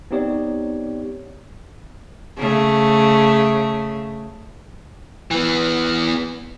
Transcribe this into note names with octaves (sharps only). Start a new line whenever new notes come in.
B3 C4 D#4 G4 C#5 D5
C#3 A3
E3 B3